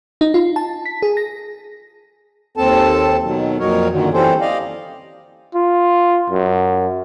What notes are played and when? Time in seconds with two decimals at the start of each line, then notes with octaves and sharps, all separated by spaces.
0.21 D#4
0.34 F4
0.56 A5
0.86 B6
1.02 G#4
1.17 A#6
2.57 D#2 C4 A4 A5
3.23 B2 D#3 F#3
3.60 F2 A#2 F#3 D#4 A#4 C#5
3.91 F#2 A#2 D3 D#3 F#3
4.13 E3 G3 C4 C#4 A4 C5
4.41 D5 D#5 F5
5.55 F4
6.30 F#2